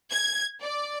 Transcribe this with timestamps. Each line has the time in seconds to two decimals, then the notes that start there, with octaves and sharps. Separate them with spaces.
0.12 G#6
0.61 D5